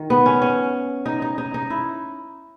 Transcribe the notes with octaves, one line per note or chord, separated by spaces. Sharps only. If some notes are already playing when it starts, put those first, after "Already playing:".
Already playing: D#3
B3
C#4
C#4
D#4
D#4
D#4
D#4
E4